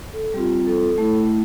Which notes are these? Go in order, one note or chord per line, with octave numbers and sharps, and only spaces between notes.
A4
G3 C4 F4 G4
A4
A3 E4